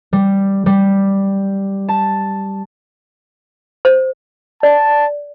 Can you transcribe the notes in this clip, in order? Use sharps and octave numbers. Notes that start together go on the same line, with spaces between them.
G3
G3
A5
C5
D5 A5